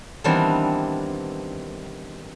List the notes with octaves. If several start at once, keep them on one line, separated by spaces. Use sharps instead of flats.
D#3 E3 G3 B3 C4 D4